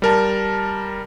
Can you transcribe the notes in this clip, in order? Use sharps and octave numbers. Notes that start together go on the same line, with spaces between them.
G3 A#4 A5